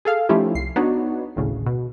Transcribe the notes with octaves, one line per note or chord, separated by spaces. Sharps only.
G#4 A4 F5
F3 A3 C#4 D#4 E4 G4
C2 C7
B3 D4 D#4 F#4 C#5
G#1 D2 A2 C#3
B2